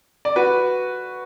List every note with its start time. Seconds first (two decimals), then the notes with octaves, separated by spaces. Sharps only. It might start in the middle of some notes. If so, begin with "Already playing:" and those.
0.25 D5
0.36 F#4 B4